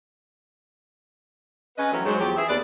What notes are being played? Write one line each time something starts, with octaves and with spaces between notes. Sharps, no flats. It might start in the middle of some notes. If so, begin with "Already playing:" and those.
C#4 B4 D#5
E3 F#3 A3 C4 C#4 F#4
G#2 F#3 C5
E2 F3 F#3 G4
E3 C#4 G#4 E5
D#2 B3 B4 D5